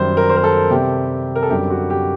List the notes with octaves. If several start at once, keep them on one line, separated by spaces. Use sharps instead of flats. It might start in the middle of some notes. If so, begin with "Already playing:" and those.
Already playing: F#2 D#3 G3 C5
A#4
C5
A#4
A4
C3 G3 C4 G4
A#4
A4
F#2 D3 G3 C4 G4
F#4
G4